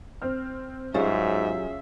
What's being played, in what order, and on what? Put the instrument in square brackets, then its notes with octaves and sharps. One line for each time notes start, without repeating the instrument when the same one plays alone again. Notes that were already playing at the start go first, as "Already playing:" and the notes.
[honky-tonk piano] C4 F6
[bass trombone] G#2 [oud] F#3 G3 C5 [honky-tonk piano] C#4 F4 G#4 [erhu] E5